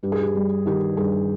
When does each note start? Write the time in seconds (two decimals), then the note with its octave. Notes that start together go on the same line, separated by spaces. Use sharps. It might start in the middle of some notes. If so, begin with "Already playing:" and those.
0.03 G2 G4
0.12 G#4
0.21 G4
0.35 G3
0.66 D#3 G4
0.97 G2 G#4